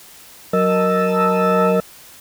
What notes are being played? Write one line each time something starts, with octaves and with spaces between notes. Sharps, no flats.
F#3 A#4 D#5 A5 E6